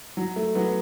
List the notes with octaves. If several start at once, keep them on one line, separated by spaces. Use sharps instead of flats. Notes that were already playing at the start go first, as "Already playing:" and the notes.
F#3
A3
F#3 B3